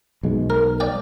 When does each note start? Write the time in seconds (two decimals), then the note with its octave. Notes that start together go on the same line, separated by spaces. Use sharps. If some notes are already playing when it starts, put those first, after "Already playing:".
0.23 B1 G#3
0.50 A#4
0.80 D5 G5